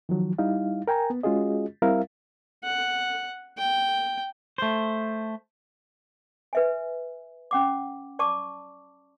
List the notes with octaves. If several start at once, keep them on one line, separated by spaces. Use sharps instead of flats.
D#3 F3 F#3
G3 D#4 E4 F5
A#4 G5 G#5 A#5
B3
G#3 C#4 F4 F#4 G#4 D#5
G3 C4 E4 A#4 E5 F5
F#5
G5
A3 C5
B4 E5 G#5
C#4 F#5 D6
D5 A5 C#6 D6